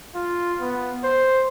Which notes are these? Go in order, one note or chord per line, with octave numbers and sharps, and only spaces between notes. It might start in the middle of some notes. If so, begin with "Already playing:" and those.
F4
B3
C5